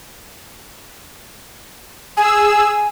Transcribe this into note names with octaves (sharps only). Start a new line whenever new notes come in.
G#4 G#5 E6